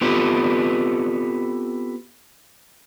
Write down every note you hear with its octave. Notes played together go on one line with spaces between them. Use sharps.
B3 C4 F4 G4 A4 B4